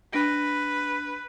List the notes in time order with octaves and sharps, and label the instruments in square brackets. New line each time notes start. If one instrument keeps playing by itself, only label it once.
[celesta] D4 A#6 D7 [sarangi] B4